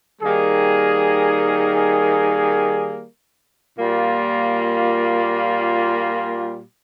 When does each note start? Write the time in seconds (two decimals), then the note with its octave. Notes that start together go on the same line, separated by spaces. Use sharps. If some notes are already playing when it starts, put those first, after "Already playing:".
0.22 D#3 G3 A#3 D#4 G#4
3.76 A#2 G3 A#3 F4